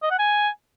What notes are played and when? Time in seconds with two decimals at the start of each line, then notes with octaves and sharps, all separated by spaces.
0.02 D#5
0.11 F#5
0.19 G#5